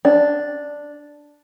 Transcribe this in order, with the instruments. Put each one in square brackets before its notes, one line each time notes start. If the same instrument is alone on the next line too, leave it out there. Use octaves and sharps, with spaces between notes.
[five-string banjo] D4